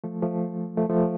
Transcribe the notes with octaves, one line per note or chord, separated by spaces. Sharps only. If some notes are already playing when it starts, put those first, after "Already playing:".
F3 A3
F3 A3
F3 A3
F3 A3